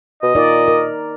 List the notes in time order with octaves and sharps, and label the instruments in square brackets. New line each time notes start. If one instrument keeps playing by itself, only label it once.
[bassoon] B2 [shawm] D#5
[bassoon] A#2 [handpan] D#4 D5
[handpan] A#4